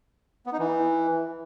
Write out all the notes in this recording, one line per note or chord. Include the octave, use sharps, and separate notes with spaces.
B3
D#4
E3